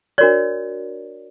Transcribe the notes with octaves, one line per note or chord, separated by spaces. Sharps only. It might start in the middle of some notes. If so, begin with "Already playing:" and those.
D4 F#4 A#4 C#5 D5